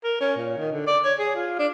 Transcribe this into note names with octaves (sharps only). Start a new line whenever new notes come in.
A#4
C#4
A#2
D#3
D3
D5
C#5
G#4
F4
D4